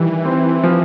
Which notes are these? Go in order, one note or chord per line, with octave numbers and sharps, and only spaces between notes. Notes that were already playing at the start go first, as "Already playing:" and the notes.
Already playing: D#3 E3 G3
C4
F3